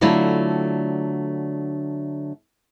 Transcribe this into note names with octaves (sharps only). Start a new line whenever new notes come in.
D3 F#3 A3 D4 E4 F4